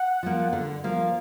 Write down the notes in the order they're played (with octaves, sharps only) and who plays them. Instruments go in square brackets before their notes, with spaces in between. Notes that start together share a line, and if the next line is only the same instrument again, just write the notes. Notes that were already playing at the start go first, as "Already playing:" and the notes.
Already playing: [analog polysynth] F#5
[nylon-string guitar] F3 A#3
D3
F3 A#3